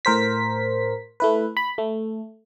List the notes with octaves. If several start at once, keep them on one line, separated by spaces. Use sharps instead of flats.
A2 A#4 C5 B6
A3 E4 B4
B5
A3